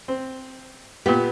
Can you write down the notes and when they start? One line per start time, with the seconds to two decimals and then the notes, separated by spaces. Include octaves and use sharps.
0.08 C4
1.06 A#2 B3 G4